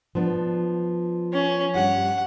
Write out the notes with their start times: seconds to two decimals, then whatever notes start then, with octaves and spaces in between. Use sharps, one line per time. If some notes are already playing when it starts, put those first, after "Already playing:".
0.15 F3 B3 D4
1.33 C#4
1.75 G2 G4 F#5